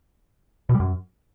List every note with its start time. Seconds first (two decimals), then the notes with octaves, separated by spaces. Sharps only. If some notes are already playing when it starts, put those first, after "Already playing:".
0.69 B2
0.74 G3
0.80 F#2